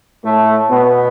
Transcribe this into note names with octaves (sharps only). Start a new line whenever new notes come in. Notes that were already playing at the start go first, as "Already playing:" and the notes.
A2 A3
B2 B3